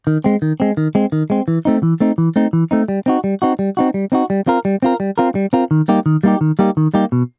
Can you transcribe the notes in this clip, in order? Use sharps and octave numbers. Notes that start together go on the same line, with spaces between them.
D#3
G#3 C4
D#3
G#3 C4
D#3
G#3 C4
D#3
G#3 C4
E3
A3 C4 D#4
E3
A3 C4 D#4
E3
A3 C4 D#4
E3
A3 C4 D#4
G3
C4 D#4 F#4
G3
C4 D#4 F#4
G3
C4 D#4 F#4
G3
C4 D#4 F#4
G3
C4 F4 A#4
G3
C4 F4 A#4
G3
C4 F4 A#4
G3
C4 F4 A#4
D#3
G3 A#3 D#4 G4
D#3
G3 A#3 D#4 G4
D#3
G3 A#3 D#4 G4
D#3
G3 A#3 D#4 G4
B2